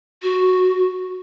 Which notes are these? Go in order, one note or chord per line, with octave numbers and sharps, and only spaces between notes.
F#4